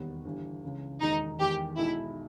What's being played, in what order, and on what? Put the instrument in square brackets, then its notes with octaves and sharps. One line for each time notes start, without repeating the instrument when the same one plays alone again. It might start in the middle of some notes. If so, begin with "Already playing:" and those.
Already playing: [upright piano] E1 D#2 D#3 G3 B3
G1 G2 E3 G3
C#2 C#3 E3
[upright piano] E1 D#2 D#3 G#3 [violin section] D#4
[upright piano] E2 D#3 G#3 [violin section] G4
[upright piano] B1 B2 G#3 D#4 [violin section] E4